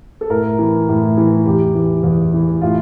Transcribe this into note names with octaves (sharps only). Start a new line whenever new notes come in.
A4
A2 A#4
E3
A2
E3
E2 G4
E3
E2
E3
A2 F4